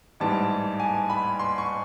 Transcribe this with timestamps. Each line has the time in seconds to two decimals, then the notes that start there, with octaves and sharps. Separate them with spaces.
0.20 A1 G#2 E3 G3 A5
0.80 G#5
1.10 B5
1.39 C6
1.58 C#6